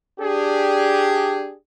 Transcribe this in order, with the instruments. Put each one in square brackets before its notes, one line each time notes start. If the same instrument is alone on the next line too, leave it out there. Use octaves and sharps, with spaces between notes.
[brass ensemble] D4 G4 G#4